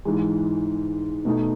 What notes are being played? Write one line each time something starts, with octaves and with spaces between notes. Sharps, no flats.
G#2 E3 G#3
B2 A3 D#4